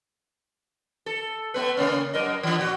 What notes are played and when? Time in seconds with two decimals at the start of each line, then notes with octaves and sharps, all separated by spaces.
1.06 A4
1.54 A3 B3 B4
1.77 C#3 A#3 C#4
2.14 F#2 A#4 D#5
2.43 E3 D4
2.58 A#2 F#4